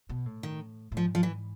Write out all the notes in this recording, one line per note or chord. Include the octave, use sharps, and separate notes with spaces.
B2
A2
D#3
A2
G#2 F3
F3
E3